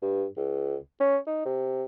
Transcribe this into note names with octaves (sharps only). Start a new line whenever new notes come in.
G2
C#2
C#4
D#4
C3